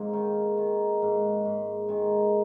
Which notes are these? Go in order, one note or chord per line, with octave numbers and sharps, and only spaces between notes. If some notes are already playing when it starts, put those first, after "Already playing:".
Already playing: G#2 A#3 C4
D#3
D#3
G#2
G#2
D#3 G#3